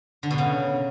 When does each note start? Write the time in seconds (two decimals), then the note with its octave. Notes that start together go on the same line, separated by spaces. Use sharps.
0.23 D3
0.31 B2
0.38 C#3